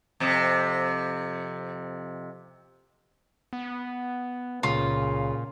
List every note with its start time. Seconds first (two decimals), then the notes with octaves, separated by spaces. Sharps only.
0.20 F2 C3
3.53 B3
4.63 C#2 A#2 C#3 F4